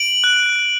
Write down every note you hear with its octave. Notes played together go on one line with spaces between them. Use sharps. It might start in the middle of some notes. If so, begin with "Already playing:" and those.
Already playing: D7 F#7
F#6